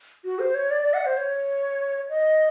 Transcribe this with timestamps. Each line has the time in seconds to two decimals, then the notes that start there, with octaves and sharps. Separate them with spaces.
0.25 F#4
0.39 C5
0.55 C#5
0.71 D5
0.82 D5
0.94 F#5
1.05 C5
1.17 C#5
2.09 D#5